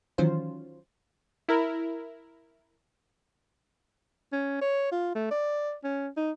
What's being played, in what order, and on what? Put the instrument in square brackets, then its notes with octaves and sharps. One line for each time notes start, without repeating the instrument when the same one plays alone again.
[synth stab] D#3 E3 F#3 C#4 F4 C5
E4 A#4
[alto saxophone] C#4
C#5
F4
A3
D5
C#4
D#4